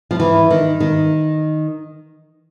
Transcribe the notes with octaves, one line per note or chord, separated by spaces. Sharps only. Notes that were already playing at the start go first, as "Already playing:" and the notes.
F3
E3
D#3
D#3